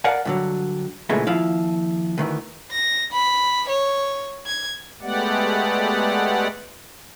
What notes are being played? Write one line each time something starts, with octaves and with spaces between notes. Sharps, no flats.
A#4 D5 F5 F#5
G2 D3 F#3
E2 A#2 C#3 E3 G#3 A3
D#2 F3 E4 F5
D2 D#3 E3
A#6
B5
C#5
G#6
G#3 A3 B3 G4 D5 F#5